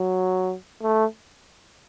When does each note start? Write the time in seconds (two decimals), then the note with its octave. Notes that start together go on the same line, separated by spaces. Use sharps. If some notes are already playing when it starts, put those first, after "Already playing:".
Already playing: F#3
0.83 A3